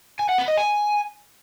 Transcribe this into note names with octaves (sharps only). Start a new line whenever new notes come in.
G#5
F#5
B4
D#5
G#5